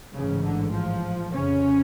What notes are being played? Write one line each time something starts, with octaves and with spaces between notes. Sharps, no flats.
A1 G#2 C#3
D3
F3
F1 F2 C#3 C#4